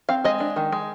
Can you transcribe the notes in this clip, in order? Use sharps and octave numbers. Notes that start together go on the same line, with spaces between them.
C4 F5
G#3 D#5
D4
D#3
G#3